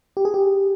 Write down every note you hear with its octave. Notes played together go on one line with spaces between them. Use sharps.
G4
G#4
G4